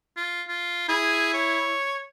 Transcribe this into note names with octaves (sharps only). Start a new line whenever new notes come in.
F4
F4
E4 G#4
C#5